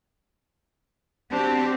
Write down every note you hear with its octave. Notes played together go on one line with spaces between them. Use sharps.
C4 D4 F#4 G4